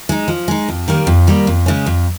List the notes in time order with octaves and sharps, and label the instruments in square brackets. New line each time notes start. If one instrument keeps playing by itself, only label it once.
[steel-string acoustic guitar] G#3 D#4
F3
G#3 D#4
F2
D#3 G3 A#3
F2
D#3 G3 A#3
F2
C#3 G#3 C#4
F2